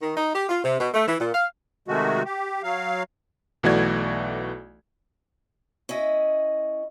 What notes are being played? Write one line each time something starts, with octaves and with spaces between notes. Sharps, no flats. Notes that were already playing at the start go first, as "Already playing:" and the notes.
D#3
D#4
G4
F4
C3
B2
A3
E3
A#2
F5
C3 D#3 G#3 A3 F#4
G4
F#3 F5
B1 E3 A3 F#4 D5 G#6
C#4 E4 D#5